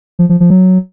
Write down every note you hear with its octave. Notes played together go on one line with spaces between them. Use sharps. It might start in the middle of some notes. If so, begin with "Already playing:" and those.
F3
F3
F3
F#3